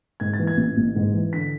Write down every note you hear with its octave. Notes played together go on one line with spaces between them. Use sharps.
G#2 G#6
A6
E3
G#6
A1
A1
G#2
E3
D3 B6